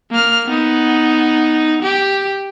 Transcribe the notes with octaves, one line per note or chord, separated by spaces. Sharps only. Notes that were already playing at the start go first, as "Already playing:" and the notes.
A#3 F6
B3 D#4
G4